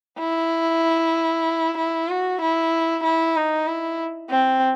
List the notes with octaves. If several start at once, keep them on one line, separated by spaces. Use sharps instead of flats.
E4
E4
F#4
E4
E4
D#4
E4
C4